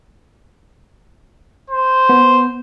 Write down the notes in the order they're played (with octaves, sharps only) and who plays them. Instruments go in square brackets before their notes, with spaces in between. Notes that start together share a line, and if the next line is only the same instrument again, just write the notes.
[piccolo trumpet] C5
[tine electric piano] B3